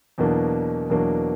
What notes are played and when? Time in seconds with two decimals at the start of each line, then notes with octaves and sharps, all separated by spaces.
0.18 E2 B2 F#3 A#3 D4
0.90 E2 B2 F#3 A#3 D4